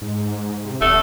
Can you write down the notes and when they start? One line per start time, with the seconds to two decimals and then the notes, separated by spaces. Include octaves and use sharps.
0.02 G#2
0.65 C3
0.81 D1 A3